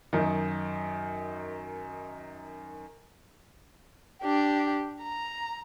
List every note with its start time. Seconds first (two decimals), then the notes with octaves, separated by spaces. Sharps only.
0.13 F#2 D#3
4.22 D4 G4
5.03 A#5